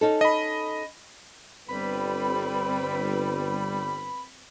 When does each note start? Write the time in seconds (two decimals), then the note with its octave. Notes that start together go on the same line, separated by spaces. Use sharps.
0.01 C#4 D#4 A4
0.21 D#5 B5
1.69 G1 G3 C4 B4 B5